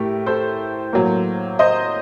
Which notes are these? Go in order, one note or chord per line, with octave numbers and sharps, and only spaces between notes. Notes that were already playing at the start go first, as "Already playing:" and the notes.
Already playing: A2 A3 G4 A#4
A4 C5
A2 F#3 A#3
C5 D#5